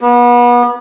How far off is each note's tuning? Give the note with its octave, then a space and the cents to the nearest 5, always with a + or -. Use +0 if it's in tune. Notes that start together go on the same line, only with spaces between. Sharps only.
B3 -30